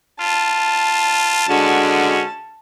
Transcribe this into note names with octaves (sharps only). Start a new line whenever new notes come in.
F4 A5
D3 G#3 C#4 F#4